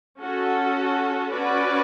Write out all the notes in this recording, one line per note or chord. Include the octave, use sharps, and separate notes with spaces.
C#4 F#4 A4
C#4 F#4 B4 D5